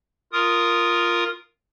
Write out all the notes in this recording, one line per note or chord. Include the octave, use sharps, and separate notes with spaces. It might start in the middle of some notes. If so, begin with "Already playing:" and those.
F4 A#4 D#6